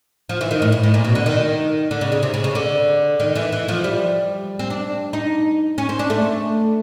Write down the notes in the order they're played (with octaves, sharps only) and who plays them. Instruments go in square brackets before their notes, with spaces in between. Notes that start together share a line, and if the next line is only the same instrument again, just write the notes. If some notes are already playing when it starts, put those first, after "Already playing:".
[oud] F3
E3
D#3
A2
A2
A2
A#2
B2
D3
D#3
D3
C#3
C#3
C3
C#3
C#3
D3
D#3
E3
E3
F3
G3
C4
D4
D#4
C#4
C4
D4
A3